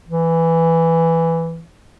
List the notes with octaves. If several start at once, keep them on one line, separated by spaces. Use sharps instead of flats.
E3